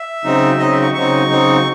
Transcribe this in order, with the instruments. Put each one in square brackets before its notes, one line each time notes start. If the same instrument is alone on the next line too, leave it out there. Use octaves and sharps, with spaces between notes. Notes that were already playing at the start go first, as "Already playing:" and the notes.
Already playing: [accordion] E5
C#3 F#3 C4 D#4
C#3 F#3 C4 D#4 D#5
E5
C#6
C#3 F#3 C4 D#4 C#6
C#3 F#3 C4 D#4